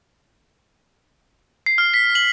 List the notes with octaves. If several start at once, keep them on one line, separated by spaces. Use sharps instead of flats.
C7
F6
B6
F#7